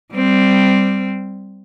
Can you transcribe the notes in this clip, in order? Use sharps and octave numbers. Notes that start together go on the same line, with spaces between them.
G3 C4